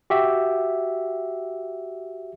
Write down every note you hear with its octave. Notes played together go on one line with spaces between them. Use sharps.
F#4 G4 E5